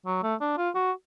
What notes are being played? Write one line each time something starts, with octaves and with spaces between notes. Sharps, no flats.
F#3
A3
D4
F4
F#4